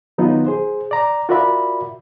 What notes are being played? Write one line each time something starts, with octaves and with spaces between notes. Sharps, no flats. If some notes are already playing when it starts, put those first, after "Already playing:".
D#3 F#3 B3 D#4 F4
G#4 C5
D5 A#5
F4 F#4 A#4 D5 E5 B5